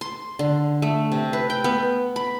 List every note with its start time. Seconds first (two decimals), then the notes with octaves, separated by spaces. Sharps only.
0.01 C6
0.39 D3
0.82 A3
1.12 C3
1.33 B4
1.50 G5
1.64 B3
2.16 B5